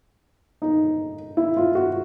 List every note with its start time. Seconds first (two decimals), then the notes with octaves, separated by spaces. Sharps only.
0.62 D#4
1.37 E4
1.57 F4
1.75 F#4